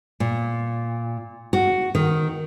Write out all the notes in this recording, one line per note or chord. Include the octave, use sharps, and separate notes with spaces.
A#2
F#4
D#3